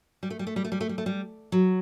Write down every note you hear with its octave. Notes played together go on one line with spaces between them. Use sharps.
G3
A3
G3
A3
G3
A3
G3
A3
G3
A3
G3
F#3